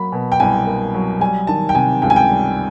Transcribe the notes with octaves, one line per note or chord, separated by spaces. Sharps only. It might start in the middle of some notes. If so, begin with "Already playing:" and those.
Already playing: F#3 A#3 B5
B2
G5
C2 G#5
A#3
F#3
G3 G#5
D#3 A5
G5
C3 G#5
C#2 G5
G#5
G5
G3